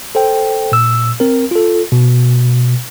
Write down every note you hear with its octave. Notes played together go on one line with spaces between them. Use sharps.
A4 C5 G5
A#2 E6
C4 A#4
F4 A4
B2